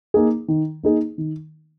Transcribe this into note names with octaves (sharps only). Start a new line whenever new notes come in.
A#3 D#4 G#4
D#3
A#3 D#4 G#4
D#3